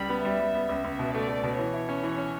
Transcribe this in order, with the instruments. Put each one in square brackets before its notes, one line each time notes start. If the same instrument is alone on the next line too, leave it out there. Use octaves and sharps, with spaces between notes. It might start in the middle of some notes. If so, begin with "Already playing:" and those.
Already playing: [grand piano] C#2 G3 [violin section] B5
[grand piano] B3
[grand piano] G3 [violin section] E5
[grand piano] G3
B3
C#2
C#2
B2
[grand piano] A3 [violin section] D5
[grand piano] A3
B2
[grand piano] E3 [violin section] C#5
[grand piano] E4
C#4
E3
C#4